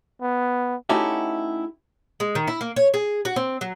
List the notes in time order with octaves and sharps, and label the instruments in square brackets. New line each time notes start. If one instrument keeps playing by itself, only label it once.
[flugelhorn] B3
[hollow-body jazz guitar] A3 C#4 D#4 E4 F#4 G4
[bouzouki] G#3
D#3
E4
A#3
C#5
G#4
F#4
C4
F#3